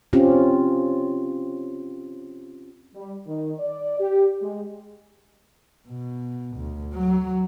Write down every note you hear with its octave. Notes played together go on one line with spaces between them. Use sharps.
C4 C#4 F4 G4
G3
D#3
D5
G4
G#3
B2
D2
F#3